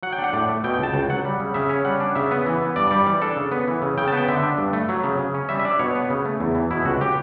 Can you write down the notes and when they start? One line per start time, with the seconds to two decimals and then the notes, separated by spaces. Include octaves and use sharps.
0.03 F#3 F#5
0.13 G5
0.19 D4
0.24 F#5
0.33 A2 D5
0.49 A3
0.64 B2 G5
0.74 G5
0.79 C#2 A5
0.93 C#2 G5
1.10 F#3 F#5
1.25 G3
1.40 C#3
1.54 C#3 E5
1.69 C#4
1.85 G3 F#5
2.00 D4
2.15 C#3 E5
2.31 B3
2.46 E3
2.61 B3
2.76 G2 D5
2.91 G3 D5
3.06 E3 D5
3.22 D4 A4
3.36 C#3
3.52 B3
3.68 E3
3.82 C#3
3.98 C#3 G5
4.08 A5
4.12 B3
4.17 G5
4.28 D3 E5
4.43 D4
4.58 G2
4.73 A3
4.89 F#3
5.03 C#3
5.19 C#3
5.34 C#4
5.49 G3 E5
5.60 E5
5.65 D4 D5
5.79 B2 C#5
5.95 B3
6.10 C#3
6.25 A3
6.40 E2
6.55 E3
6.71 B2 E4
6.85 C#2 F#4
7.01 G4